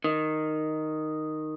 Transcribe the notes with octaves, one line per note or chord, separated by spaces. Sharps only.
D#3